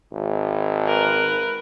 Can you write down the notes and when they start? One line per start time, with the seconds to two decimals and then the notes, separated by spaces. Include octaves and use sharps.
0.12 G#1
0.87 A#4 B4